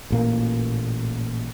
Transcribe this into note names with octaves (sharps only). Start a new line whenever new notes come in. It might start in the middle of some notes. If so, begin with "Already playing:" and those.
A1 A#2 A#3